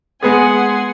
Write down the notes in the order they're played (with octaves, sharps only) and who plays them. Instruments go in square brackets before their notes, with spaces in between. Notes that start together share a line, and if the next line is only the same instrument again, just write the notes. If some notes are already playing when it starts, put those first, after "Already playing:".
[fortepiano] G#3 B3 G#4 [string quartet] F#5 G#5 C6